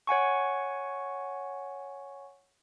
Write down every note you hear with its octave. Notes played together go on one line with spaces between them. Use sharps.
C#5 F#5 G#5 C#6